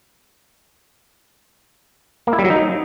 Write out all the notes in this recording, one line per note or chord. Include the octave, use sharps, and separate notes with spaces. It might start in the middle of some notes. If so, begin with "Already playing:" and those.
A#3
E4
G3
F#3
D#4